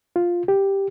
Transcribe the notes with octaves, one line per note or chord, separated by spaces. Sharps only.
F4
G4